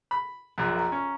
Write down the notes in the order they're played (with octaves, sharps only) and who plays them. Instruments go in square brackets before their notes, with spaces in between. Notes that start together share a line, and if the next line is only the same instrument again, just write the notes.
[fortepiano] B5
A#1 F#2
[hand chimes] F5 A#5
[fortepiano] C#4